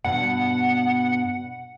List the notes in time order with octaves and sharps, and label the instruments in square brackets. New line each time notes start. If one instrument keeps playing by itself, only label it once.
[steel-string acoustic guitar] G2 B2 [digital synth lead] F#5